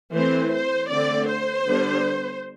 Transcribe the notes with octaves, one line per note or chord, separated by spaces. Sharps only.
E3 A3 C4 C5
C5
D3 A3 C4 D5
C5
D3 G3 B3 D4